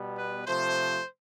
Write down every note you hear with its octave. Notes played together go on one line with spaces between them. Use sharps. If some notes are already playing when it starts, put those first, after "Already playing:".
Already playing: B2 G3 B3
B4
C3 F3 A3 C5